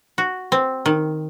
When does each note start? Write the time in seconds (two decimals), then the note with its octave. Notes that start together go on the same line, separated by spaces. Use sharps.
0.18 F#4
0.52 C4
0.86 D#3